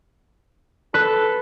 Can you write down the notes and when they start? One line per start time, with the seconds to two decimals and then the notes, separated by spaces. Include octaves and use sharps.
0.94 A4 B4